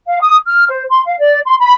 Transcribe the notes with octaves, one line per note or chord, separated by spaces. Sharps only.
F5
D#6
F6
C5
C6
F5
D5
C6
B5